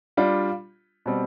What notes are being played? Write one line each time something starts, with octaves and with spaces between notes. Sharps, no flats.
G3 D4 F4
B2 G3 C4